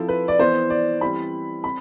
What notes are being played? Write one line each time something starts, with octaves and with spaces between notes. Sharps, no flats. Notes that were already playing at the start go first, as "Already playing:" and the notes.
Already playing: F3 C4 E4 A4
B4
D5
E3 B3 E4 C5
D5
E3 G3 C4 E4 B5
C4 B5